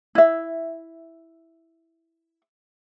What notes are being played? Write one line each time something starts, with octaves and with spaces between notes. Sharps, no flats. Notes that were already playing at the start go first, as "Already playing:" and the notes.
E4 E5